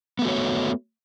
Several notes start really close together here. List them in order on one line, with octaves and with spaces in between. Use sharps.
B3 A3 F#4 C#5